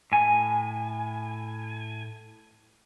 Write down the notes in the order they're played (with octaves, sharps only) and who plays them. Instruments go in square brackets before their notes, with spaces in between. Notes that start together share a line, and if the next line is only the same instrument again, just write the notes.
[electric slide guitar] A2 G#5